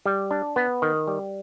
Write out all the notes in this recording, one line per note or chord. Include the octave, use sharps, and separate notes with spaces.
G3
D4
B3
D#3
G3